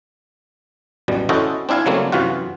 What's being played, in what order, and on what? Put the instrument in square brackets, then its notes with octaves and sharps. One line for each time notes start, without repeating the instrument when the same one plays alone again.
[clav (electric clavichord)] A1 F#2 B2 G3
C#4 E4 F#4 A4 C5 D#5
C4 D4 E4 F5 G#5
C#3 F#3 G3 A3 A#3 C4
F#2 C3 E3 F4 F#4